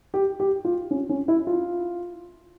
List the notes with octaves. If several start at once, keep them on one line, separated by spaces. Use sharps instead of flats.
G4
G4
F4
C#4
C#4
E4
F4